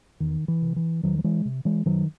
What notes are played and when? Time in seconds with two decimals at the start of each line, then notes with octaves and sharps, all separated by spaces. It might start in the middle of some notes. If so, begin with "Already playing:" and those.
0.20 E2 D#3
0.48 E3
0.62 C3
0.76 E3
1.03 E2 D#3 F#3
1.18 F#3
1.24 E3 G#3
1.45 C3
1.65 E3 G#3
1.86 F#2 D#3 F#3